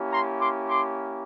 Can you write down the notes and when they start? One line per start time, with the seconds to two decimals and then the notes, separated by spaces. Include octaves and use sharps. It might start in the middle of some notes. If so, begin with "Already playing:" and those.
Already playing: A#3 C#4 E4 G4
0.11 A#5 C6
0.39 C6 D6
0.68 C6 D6